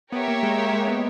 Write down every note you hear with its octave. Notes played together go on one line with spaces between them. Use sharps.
B3 G4 A#4 C#5 E5
A#3
G#3
G#3
G#3
B3